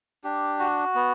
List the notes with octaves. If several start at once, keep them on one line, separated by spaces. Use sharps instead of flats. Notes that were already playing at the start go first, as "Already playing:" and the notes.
D4 G4
F#4
B3